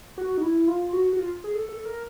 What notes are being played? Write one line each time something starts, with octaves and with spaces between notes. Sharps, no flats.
F#4
D#4
E4
F4
F#4
F#4
F4
G#4
A4
A4
A#4